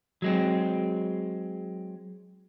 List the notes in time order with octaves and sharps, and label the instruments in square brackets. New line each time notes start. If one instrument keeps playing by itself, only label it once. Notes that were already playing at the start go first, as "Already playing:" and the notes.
[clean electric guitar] F#3 G#3 C4